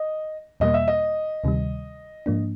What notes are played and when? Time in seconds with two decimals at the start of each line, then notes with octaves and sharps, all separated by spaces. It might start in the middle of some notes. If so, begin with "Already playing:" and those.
Already playing: D#5
0.60 E2 B2 G3 A#3 D#5
0.74 E5
0.88 D#5
1.44 D2 C3 D#3 G3
2.26 G#2 F3 A#3 D4